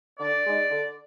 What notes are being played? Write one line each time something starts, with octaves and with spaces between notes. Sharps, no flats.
D3 D5
G#3 D#4
D3